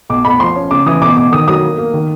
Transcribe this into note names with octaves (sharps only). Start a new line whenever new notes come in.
B1 D6
B1 B5
F3 C6
C#4
C#3 D6
E3 D#6
B2 D6
B2 D6
D#3 D#6
F#3 D#6
A#3
A#3
D#3